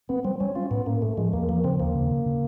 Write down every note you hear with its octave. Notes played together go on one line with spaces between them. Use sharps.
B3 C4
G3 C4
G3 C#4
C#4 F4
A2 B3
A#3 C#4
A2 A3
F3 G#3
E2 A#3
F3 A#3
C#3 C4
D#2 A#3
C#3
C#3
C#3